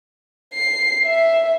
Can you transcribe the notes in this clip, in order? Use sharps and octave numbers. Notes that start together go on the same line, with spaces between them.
C7
E5